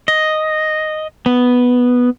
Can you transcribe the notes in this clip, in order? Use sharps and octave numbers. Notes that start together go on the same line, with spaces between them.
D#5
B3